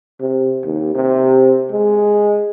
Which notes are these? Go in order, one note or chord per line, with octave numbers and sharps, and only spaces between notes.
C3
D#2
C3
G#3